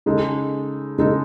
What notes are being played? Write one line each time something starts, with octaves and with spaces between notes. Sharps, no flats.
C#3 G#3 D#4 A4
C#3 G#3 D#4 A4